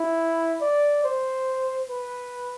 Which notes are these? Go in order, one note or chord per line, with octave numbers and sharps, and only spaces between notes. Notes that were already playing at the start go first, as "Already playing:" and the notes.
Already playing: E4
D5
C5
B4